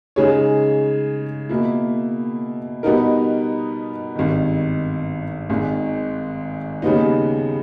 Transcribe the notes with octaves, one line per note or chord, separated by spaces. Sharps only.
C#3 G#3 D#4 G#4 C#5
B2 A#3 E4
B2 G3 B3 D#4 A#4
G#1 G2 D#3
G#1 G#2 D#3
D#2 C#3 G3 B3 D#4